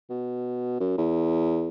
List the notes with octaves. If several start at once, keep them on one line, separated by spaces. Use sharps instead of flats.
B2
F#2
E2